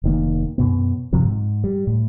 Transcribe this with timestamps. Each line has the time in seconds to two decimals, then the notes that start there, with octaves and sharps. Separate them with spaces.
0.04 F1 D#3 A#3
0.58 F#2 B2 B3
1.13 F#2 C3 F3
1.25 G#2
1.64 G3
1.87 A2